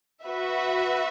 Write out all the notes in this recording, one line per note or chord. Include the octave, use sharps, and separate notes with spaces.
F#4 B4 E5